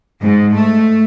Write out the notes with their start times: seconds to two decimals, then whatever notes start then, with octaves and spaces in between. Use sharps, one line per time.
0.22 G#2
0.55 A3